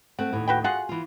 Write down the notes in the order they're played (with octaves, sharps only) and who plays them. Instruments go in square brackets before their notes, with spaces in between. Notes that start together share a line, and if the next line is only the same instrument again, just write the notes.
[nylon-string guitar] A3 C4 [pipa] F#5
[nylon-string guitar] D#2 A2
[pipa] F#4 B4 G5
[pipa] F4 F#4 G#4 [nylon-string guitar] F#5
[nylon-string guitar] E3 F4